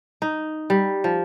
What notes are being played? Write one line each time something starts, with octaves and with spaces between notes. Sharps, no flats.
D#4
G3
F3